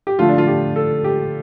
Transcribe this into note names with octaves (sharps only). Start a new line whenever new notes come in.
G4
D3 F3 A3 F4
D4
F4
G4
A4
G4